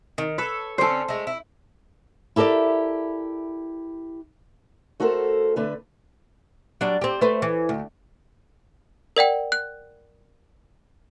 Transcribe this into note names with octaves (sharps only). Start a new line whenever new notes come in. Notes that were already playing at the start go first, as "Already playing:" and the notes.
D#3
A4 B4 C#5
D3 C4 C#4 A4 C5
G#3 A3
E4
E4 G4 A4 A#4 D5 E5
A3 F#4 A4 A#4 C5
D3 A3 B4
F#3 G3 D4
C4 G4
A3 B4 C5
E3
D2
A#4 D5 F#5 G5
F#6